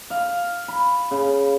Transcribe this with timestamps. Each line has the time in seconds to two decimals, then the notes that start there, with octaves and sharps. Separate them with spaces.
0.10 F5
0.68 B5
1.11 C#3